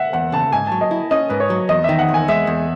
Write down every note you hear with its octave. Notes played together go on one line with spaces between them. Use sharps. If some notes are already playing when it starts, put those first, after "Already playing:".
Already playing: E5 F#5
E2 F#5
C#3 A5
G#2 G#5
F#3 A5
D#5
E4
C#4 D#5
G#2 B4
C#5
F#3
E2 D#5
D#3 E5
F#5
E2
G#5
G#3 E5
E2